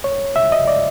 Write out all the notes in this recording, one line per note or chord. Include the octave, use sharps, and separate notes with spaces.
C#5
E5
D#5
D5